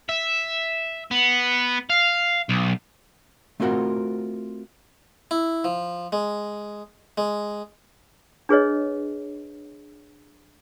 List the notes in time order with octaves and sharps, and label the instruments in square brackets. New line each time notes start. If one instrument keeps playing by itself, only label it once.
[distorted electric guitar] E5
B3
F5
B1
[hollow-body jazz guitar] A3 C4 F4 F#4 A#4 F#5
[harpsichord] E4
F3
G#3
G#3
[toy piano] D4 G#4 B4 C#5 D#5